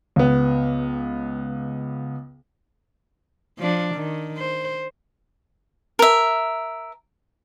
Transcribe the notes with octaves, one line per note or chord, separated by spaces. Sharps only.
C#2 B3
F3 D4
D#3
C5
A#4 E5